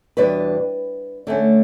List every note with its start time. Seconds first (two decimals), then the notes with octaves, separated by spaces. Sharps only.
0.17 E2 B2 G3 D4 B4
1.27 D3 A3 C#4